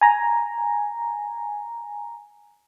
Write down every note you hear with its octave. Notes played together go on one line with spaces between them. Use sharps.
G#5 A#5